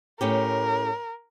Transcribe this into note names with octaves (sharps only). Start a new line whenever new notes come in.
A2 C#4 G4 A#4